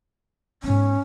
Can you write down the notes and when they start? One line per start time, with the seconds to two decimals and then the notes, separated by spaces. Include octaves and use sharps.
0.63 G#2 B3 C#4